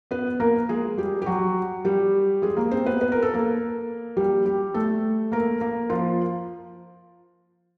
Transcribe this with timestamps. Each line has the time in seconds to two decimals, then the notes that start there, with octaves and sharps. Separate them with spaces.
0.11 B3 B4
0.40 A#3 A#4
0.69 G#3 G#4
0.97 G3 G4
1.22 G4
1.26 F#3 F#4
1.85 G3 G4
2.42 G#3 G#4
2.57 A#3 A#4
2.71 C4 C5
2.86 B3 B4
3.01 B4
3.12 A#4
3.22 A4
3.34 A#3 A#4
4.17 G3 G4
4.46 G3 G4
4.74 A3 A4
5.32 A#3 A#4
5.61 A#3 A#4
5.90 F3 F4